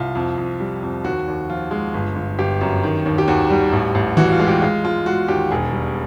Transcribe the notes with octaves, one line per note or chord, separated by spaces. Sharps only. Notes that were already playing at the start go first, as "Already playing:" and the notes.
Already playing: C2 F4
F2
F2
G3
F2
D#2 F#4
D#2
F3 F4
G#3
G1
G1
G1 G4
F#2
D#3
D#2
G4
D#2 F#4
G3
A1
A1
E3 F#4
F4
G#3
G4
G#3 F4
G#3 F4
G#3 F#4
D#2 G4
E1 G#4
G3